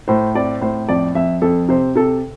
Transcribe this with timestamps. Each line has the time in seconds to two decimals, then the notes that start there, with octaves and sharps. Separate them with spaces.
0.08 A2 C5
0.35 C4 D5
0.61 A2 C5
0.89 F2 D5
1.15 F2 E5
1.42 F2 A4
1.69 C3 C5
1.96 C3 A4